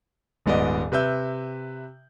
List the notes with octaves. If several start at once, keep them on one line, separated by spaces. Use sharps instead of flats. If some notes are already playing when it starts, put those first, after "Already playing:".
D#1 G#2 B3 D5 D#5
C3 B4 E5 G6